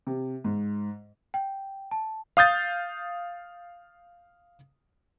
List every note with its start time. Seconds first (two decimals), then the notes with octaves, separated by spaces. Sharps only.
0.07 C3
0.44 G#2
1.34 G5
1.91 A5
2.37 F5 D#6 G6 A6